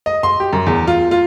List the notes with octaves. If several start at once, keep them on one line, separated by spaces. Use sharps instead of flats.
D#5
C6
G4
F#2
E2
F4
F4